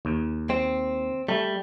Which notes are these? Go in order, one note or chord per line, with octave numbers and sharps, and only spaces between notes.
D#2
C4
G3 A3